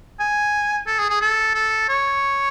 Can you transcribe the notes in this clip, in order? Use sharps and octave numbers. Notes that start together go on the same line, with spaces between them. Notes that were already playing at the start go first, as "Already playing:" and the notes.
G#5
A4
G#4
G#4
A4
A4
C#5